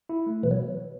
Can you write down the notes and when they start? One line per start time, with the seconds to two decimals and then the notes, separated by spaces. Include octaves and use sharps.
0.09 E4
0.27 A3
0.43 B2 E3
0.51 F#3